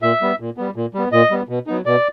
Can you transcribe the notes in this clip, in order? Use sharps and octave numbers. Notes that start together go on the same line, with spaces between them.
A#2 E5
G3 B3
A#2
G3 B3
A#2
G3 B3
A#2 D#5
G3 B3
B2
F#3 B3 D#4
B2 D5